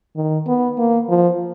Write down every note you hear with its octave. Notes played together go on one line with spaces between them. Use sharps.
D#3
B3
A#3
F3